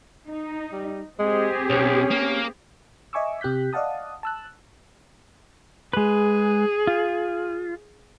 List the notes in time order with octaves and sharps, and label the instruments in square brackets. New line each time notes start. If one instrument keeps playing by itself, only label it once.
[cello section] D#4
[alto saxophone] G3
[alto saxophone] G#3 [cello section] C4 G4 G#4
[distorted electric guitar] B1 [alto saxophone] C#4
[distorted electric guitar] A#3
[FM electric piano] D#5 E5 G#5 C#6 D6 E6
C3 G4 F#6 G6 B6
D5 D#5 F5 F#5 A5 D#6
A5 E6 F#6
[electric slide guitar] G#3 B4 [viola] G#4
[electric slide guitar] F4